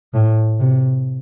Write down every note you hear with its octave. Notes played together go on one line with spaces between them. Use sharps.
A2
C3